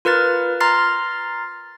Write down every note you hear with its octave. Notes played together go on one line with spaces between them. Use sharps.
F4 A#4 B4 F6 A6
A#5 C6 F6 A6 C7